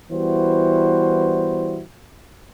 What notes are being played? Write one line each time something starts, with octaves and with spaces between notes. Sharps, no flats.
E3 G3 B3 E4 F#4 C5